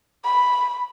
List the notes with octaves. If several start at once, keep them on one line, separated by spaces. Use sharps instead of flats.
B5